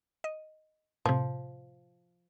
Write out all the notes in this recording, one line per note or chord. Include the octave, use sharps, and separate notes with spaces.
D#5
A2 C3 F3